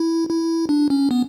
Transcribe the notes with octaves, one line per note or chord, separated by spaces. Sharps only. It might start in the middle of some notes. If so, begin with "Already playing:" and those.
Already playing: E4
E4
D4
C#4
B3